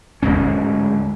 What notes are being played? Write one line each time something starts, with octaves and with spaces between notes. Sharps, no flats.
D1 A#1 G#2 C#4